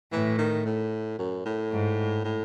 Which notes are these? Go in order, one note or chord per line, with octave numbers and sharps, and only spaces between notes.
A2 E3
D#3
A2
F#2
A2
G#2
A2